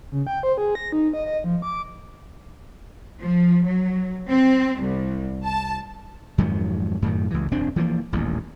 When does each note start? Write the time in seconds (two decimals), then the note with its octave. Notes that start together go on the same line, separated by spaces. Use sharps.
0.12 C#3
0.27 G5
0.43 C5
0.58 G#4
0.75 A#6
0.92 D#4
1.14 D#5
1.26 D#5
1.44 F3
1.62 D6
3.21 F3
3.64 F#3
4.29 C4
4.81 C2
5.45 A5
6.38 F2 G#2 D#3 F#3
7.02 F#2 A2 D#3
7.31 C#2 E3
7.51 E1 F#2 C4 D4
7.76 E3 F3 G#3 A#3
8.12 D#1 A1 D#2